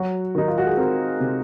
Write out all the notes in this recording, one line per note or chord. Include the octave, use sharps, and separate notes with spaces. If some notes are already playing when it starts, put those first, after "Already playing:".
Already playing: F#3 F#4
D#3 D#4
F4
F#4
G#4
C4 A#4
C3